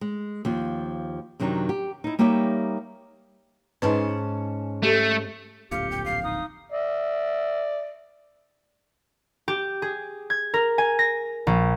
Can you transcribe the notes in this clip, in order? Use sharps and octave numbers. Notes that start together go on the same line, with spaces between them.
G#3
D#2 F3 F4
F#2 C3 D#3 F#3 D4 D#4
G4
D#4 E4
G3 A#3 D#4 G4 C#5 E5
G#2 C#4 D#4 B4 A5
A3 G4 A4
D1 A#1 F2 G4 F5 C#7
G5
F5 C7
D#4 D#6
D5 E5
G4
G#4
G#6
A#4
G#5
A#6
A#1